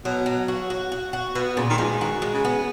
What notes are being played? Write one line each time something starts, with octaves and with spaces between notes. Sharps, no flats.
B2 F#3
F#3
F#4
F#4
F#4
F#4
B2 B3
A#2 C#3
D#3
F3 G#3
D#3 F#4
G#3
C#3
B3